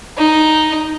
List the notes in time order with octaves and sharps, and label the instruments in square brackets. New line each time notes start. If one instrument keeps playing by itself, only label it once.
[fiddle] D#4